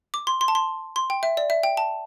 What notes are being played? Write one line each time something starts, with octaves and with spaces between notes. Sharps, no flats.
D6
C6
C6
A5
C6
C6
G5
E5
D5
E5
G5
A5